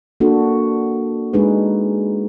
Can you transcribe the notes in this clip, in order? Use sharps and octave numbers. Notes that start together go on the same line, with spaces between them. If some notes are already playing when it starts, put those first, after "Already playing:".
A#3 D4 F#4 A4
G#3 D4 D#4 G#4 B4